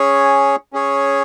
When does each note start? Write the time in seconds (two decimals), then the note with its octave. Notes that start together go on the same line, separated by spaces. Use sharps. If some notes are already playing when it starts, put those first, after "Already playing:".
Already playing: C#4 G#4 C#5
0.73 C#4 G#4 C#5